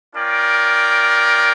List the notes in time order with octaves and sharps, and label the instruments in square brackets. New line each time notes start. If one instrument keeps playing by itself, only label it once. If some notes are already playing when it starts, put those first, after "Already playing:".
[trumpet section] C#4 F4 A#4 D5 G5